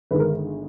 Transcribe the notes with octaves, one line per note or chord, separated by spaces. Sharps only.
G1 D#3 G#3 B4
A#4